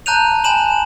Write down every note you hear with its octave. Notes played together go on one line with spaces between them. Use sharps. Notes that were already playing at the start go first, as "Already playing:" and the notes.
A5 A#5 F#6 G6 D#7 F7
G#5 A5 B5 E7 F#7